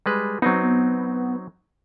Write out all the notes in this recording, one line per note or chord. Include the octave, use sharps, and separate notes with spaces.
G3 G#3 B4
F#3 B3 C4 D#4